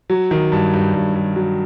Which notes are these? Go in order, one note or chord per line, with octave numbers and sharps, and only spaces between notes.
F#3
D#3
G2
G2
G2
G2
F#3